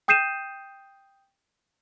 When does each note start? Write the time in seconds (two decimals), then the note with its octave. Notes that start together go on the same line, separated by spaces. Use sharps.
0.08 G5 D#6 G6 C7 D#7 E7